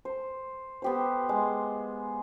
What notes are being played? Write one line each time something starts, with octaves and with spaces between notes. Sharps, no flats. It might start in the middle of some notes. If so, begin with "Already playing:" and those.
C5
B3 G4 C5
G#3